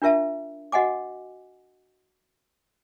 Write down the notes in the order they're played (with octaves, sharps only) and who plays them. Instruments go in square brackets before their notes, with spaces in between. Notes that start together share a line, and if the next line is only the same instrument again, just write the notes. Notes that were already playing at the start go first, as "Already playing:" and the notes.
[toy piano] D4 F4 A#4 E5 A5
F#4 D#5 F#5 G#5 D6